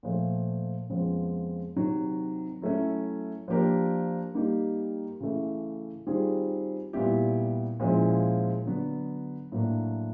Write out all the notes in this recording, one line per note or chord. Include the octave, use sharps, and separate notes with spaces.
A#2 F3 A3
F2 C#3 F3 G#3 B3
C3 D#3 F#3
F#3 A3 C#4 E4
F3 A#3 D4 G4 A#4
G3 A#3 D#4 G4
C#3 E3 A3
D#3 G3 C4 F4 G#4
A#2 G3 B3 E4 G4
A#2 F3 G#3 C#4 E4
D3 F#3 B3
A2 F#3 A#3 D4